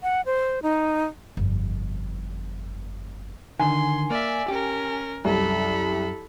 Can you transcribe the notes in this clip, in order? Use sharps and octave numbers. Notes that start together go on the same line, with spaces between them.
F#5
C5
D#4
G1 F2
D3 D#3 G#5 C6
A#3 D5 E5
C#4 G4 A#4
C2 F#2 A4 B5